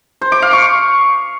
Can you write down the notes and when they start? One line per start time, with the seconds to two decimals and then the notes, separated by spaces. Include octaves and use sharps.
0.21 C5
0.32 D6
0.42 F5
0.53 C#6